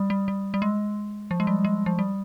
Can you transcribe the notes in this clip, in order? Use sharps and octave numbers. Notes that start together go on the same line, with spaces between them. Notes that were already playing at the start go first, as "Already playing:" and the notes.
Already playing: G3
G3
G3
G3
G#3
F3
G#3
G3
G#3
F3
G3